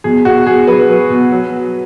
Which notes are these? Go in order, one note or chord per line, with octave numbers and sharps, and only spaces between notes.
B2 G#4
B2 F#4
B2 G#4
F#3 B4
F#3
B2
F#3